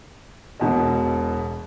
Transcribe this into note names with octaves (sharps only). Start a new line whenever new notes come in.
E1 B2 D#5